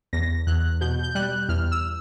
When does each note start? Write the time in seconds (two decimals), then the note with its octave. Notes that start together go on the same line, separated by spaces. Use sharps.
0.13 E2 A#6
0.47 E2 F#6
0.81 B2 G6
1.03 G6
1.15 G3 F#6
1.49 E2 F6
1.72 E6